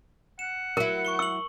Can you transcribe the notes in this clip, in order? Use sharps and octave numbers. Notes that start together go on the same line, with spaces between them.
F#5 E7
F#3 E4 A#4
C#6 C#7 G7
C#6 E6 F#7